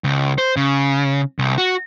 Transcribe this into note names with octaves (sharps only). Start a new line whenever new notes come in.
C#2
C5
C#3
C2
F#4